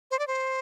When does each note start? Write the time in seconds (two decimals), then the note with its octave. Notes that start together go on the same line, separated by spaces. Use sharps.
0.11 C5
0.19 D5
0.27 C5